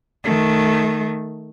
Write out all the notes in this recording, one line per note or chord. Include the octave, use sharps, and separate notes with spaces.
D#3 A3